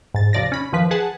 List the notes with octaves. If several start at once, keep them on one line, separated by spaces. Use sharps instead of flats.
G#2 A6
D#2 C3 F3 D5 A6 A#6
C#4 B5
F#2 D#3 F3 B4 B6
G#4 B4 F#5 G#5 A5